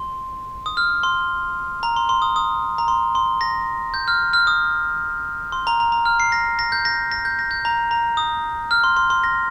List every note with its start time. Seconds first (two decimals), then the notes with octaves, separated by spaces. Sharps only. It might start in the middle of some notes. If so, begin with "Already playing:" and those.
Already playing: C6
0.66 D#6
0.77 F6
1.03 C6
1.83 A#5
1.96 C6
2.09 C6
2.22 D#6
2.36 D#6
2.78 A#5
2.88 C6
3.15 C6
3.41 A#6
3.94 G6
4.08 F6
4.33 F6
4.47 D#6
5.52 C6
5.67 A#5
5.80 A#5
5.92 A#5
6.06 F6
6.20 C7
6.32 A#6
6.59 A#6
6.72 G6
6.85 A#6
7.12 A#6
7.25 G6
7.39 A#6
7.51 G6
7.65 A#5
7.91 A#5
8.17 D#6
8.71 F6
8.84 C6
8.97 C6
9.10 C6
9.24 A#6